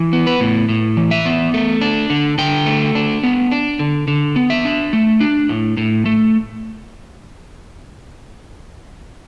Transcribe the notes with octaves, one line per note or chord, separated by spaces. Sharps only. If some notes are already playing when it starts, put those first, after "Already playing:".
Already playing: E3
B3
B4
A2
A2
E3
E5
B3
A3
D4
D3
D3 G5
A3
D4
B3
D4
D3
D3
B3
E5
D4
A3
D4
A2
A2
A3